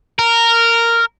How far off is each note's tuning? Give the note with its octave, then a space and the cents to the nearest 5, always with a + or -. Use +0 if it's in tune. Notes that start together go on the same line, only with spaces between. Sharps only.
A#4 -10